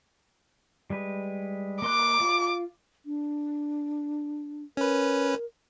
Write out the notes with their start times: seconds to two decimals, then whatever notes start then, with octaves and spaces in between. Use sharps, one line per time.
0.90 G3 G#3 B4
1.82 A#3 C6 D6 F#6
2.20 F4
3.06 D4
4.77 C#4 A#4 B4